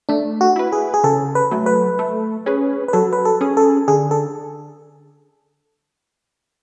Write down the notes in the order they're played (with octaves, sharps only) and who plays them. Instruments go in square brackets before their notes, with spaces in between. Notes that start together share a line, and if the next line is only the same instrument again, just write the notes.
[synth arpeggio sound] A3 [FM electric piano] D4
[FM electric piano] F#4
[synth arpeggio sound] E4 B4
[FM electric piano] G#4
G#4
[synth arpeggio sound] C#3 [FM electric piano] A4
[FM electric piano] B4
[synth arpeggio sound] F#3 A3
[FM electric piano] B4
[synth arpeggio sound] A3
C#4 G#4 B4
[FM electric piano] B4
[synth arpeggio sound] F#3 [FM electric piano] A4
[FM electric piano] B4
A4
[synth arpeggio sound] C#4 G#4
[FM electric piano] A4
[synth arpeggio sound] D3 [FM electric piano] G#4
[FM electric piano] A4